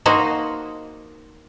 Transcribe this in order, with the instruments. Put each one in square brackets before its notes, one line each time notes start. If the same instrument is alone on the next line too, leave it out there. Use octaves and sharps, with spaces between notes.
[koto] A#3 D#4 F#4 C5